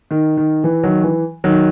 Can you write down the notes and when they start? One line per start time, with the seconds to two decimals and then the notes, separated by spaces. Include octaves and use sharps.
0.11 D#3
0.37 D#3
0.64 E3
0.83 D#3 F#3
1.04 E3
1.44 D#3 F#3